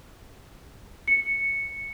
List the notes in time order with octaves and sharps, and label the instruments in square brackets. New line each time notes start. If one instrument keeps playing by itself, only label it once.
[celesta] C#7